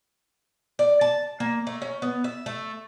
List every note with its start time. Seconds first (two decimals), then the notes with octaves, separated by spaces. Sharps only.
0.79 D5
1.01 A5
1.40 A#3
1.67 A3
1.82 C#4
2.02 B3
2.24 E5
2.46 A3